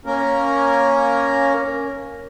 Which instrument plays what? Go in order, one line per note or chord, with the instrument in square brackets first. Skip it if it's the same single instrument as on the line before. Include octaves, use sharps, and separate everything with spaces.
[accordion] A#3 C#4 A#4